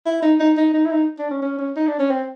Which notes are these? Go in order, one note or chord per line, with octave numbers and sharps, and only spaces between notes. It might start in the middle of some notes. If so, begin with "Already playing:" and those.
E4
D#4
D#4
D#4
D#4
E4
D#4
D4
C#4
C#4
C#4
D#4
D4
C#4
C4